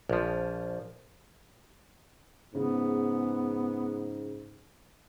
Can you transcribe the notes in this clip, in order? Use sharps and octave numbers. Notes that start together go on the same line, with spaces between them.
A#1 F3
G#2 C#3 B3